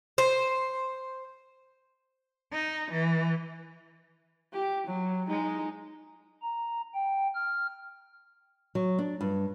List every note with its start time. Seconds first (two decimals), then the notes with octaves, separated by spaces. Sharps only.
0.18 C5
2.52 D#4
2.92 E3
4.53 G4
4.87 F#3
5.28 G#3 D#4
6.42 A#5
6.94 G5
7.35 F6
8.75 F#3
8.99 D4
9.21 G2